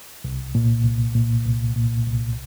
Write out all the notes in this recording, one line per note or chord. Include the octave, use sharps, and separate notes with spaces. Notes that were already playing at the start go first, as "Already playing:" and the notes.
C2
A#2
C2
A#2
C2
A#2
C2